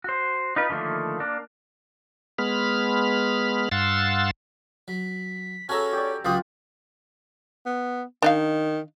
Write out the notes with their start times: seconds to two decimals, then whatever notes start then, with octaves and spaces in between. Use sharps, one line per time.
0.04 F#4 C5
0.56 D#4 F4 B4
0.70 D3 D#3 F3 A3 A#3
1.20 A#3 D4
2.38 G#3 B3 B5 F6
3.72 G2 F5 F#5 C6 E6 A6
4.88 F#3 B6
5.69 C#4 F#4 G#4 A4 C#5 A#5 E6
5.93 G4 D5
6.25 C#2 F#3 F4 G4 F#5 B5 D#6
7.66 B3
8.22 D#3 D4 D#4 F5